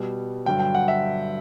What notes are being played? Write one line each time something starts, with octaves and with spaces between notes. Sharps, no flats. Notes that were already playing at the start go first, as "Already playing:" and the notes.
Already playing: B2 G3
G2 D3 F#3 G5
G5
F#5
E5